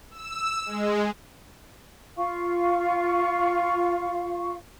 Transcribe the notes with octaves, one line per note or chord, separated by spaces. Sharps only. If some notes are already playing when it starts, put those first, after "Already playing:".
E6
G#3
F4 F5 C#6